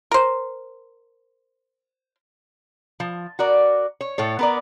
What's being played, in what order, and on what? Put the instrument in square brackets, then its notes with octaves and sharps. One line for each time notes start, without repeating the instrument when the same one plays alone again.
[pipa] A#4 C5
[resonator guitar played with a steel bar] F3
F#4 A#4 D5
C#5
A2 A4 C#5
B3 A#4 D5